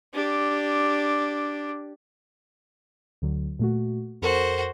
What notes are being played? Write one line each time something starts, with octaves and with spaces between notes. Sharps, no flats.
D4 G4
D2 D3 F#3
A#2 A3 F#4
F2 F#4 A4 A#4 C5